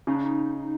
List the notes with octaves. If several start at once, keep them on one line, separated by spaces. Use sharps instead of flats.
C#3 D#4
D4
D#4